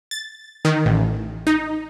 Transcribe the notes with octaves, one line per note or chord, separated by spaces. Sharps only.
A6
D#3
A1
D#4